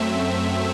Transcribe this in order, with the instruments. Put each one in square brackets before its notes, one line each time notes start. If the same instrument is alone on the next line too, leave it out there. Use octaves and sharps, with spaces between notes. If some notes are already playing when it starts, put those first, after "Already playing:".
Already playing: [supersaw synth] F#2 F#3 A3 C4 E5